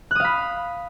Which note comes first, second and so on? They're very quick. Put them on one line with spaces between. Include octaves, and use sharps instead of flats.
F#6 D#6 F5 B5